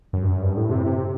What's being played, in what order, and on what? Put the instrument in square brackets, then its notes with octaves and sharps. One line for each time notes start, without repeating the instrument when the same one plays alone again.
[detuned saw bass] F#2
G2
F#2
G2
A2
C3
C3